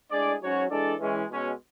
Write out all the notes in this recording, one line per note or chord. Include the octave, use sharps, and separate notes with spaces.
A2 G#3 D4 G#4 D5
G#2 F#3 C#4 F#4 C#5
E3 G#3 D4 A4 D5
E3 G#3 C#4
B2 G#3 C#4